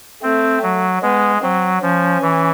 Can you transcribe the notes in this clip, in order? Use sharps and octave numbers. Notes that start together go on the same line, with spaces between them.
A3 C4
F#3
G#3 B3
F#3 C4
F3 C#4
E3